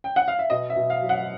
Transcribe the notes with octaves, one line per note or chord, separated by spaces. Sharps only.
G5
F#5
F5
E5
B2 D#5
E5
B2
F5
F#3
F#5